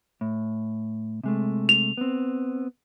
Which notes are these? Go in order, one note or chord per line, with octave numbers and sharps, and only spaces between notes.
A2
C3 G#3 A3
F7
B3 C4